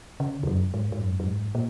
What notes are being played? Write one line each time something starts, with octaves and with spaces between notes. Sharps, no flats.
C#3
E2
F#2
G#2
G#2
F#2
F#2
G#2
A#2